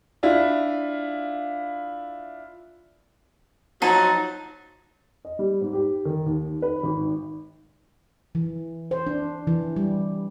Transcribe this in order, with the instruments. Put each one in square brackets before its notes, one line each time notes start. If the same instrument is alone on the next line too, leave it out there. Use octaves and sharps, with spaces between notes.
[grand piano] D4 E4 F4
[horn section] F3 F#3 [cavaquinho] D#4 A5
[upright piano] D#5
G3
G#2
G4
D#3
D#2
B4
G#1
[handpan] E3
C5
D4
E3
G3